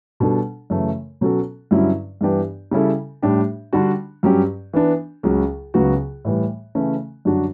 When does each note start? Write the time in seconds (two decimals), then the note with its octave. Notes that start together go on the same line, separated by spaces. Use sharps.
0.20 B2 G3 D4 A4
0.70 F#2 C#3 E3 A3
1.21 B2 F#3 C#4 F#4 A4
1.71 G2 D3 F#3 C#4 E4
2.21 G2 E3 B3 D4 G4
2.71 C#3 G3 C#4 E4 A4
3.22 A2 G3 D4 G4
3.73 D3 G3 D4 F#4
4.23 G2 F#3 C#4 G4
4.73 E3 B3 D4
5.23 C#2 C#3 F#3
5.74 C#2 C#3 F#3 B3 F#4
6.25 A2 E3 G3
6.75 C#3 E3 A3 C#4
7.25 F#2 D3 G3 D4 F#4